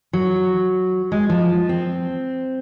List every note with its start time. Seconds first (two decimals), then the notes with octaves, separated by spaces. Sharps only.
0.13 F#3
1.12 G#3
1.29 F3
1.69 C4